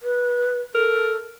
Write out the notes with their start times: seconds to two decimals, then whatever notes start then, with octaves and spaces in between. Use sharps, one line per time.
0.03 B4
0.75 A4 A#4